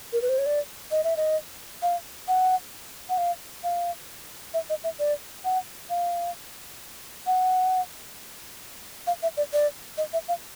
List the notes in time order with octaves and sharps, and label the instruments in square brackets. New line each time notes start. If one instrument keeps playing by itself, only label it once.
[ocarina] A#4
B4
C5
C#5
D5
D#5
E5
D#5
F5
F#5
F#5
F5
F5
E5
D#5
E5
D5
F#5
F5
F#5
F5
E5
D5
D5
D#5
E5
F5